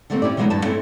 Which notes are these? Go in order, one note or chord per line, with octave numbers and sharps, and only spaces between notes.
D3 G3 A3 A#3 C4
C#4 E4 G4 D5
D#3 E3 F#3 G#3 B3 D#4
G2 D4 B4 A5
A3 C4 C#4 E4 A4